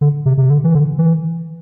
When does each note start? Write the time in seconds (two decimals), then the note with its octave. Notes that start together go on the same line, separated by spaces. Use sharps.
0.01 D3
0.26 C3
0.37 C3
0.50 D3
0.64 E3
0.75 D3
0.98 E3